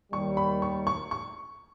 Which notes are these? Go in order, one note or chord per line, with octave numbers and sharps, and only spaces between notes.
D#2 D#3 G3 C#6
B5
C#6
C#6
C#6